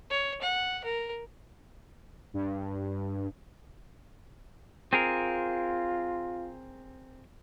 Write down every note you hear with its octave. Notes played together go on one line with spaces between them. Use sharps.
C#5
F#5
A#4
G2
C4 F4 G#4 A#4